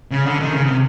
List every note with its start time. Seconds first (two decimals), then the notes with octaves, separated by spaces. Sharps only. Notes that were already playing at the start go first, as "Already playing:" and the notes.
0.11 C#3
0.26 D3
0.40 D#3
0.53 C#3
0.65 C3